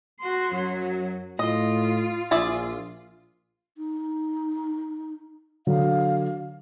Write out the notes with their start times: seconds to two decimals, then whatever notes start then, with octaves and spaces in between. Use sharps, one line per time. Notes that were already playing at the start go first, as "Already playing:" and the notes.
0.20 F#4 C6
0.52 F#2 F#3
1.39 A2 F4 D#5
2.31 A#1 F4 G#4 D5 E5
3.78 D#4
5.67 D3 F#3 F5